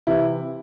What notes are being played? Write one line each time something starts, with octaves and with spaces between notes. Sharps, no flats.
C3 E3 E4